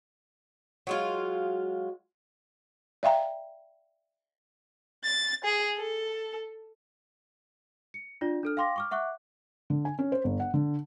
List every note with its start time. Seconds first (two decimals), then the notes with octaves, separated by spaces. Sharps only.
0.87 F#3 G#3 F4
3.03 D5 E5 F5 G5 A#5
5.04 A6
5.45 G#4
5.77 A4
7.94 C#7
8.21 D4 F4 D5
8.43 D4 A4 F6
8.57 F5 G5 C6 D6 A#6
8.76 C#6 D6 F6
8.91 E5 F#5 C#6 D6 F#6
9.70 D3
9.85 G#5
9.99 C#4
10.12 C5
10.24 G1
10.40 F#5
10.54 D3